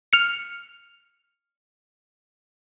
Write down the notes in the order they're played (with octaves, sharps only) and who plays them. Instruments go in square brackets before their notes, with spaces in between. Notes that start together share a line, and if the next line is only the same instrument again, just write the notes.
[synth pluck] F6 C#7